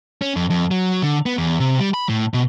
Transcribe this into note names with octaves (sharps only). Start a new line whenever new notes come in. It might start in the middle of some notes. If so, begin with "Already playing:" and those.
C#4
F2
F2
F#3
D3
B3
E2
C3
G3
B5
A2
B2